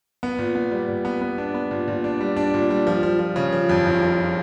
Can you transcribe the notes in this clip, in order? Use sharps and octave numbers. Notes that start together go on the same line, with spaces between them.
B3
A#2
B3
G3
A#2
B3
B3
D4
B3
A#2
A#2
D4
G3
D4
A#2
G3
F3
F3
F3
C#3
F3
F2
F#1
F3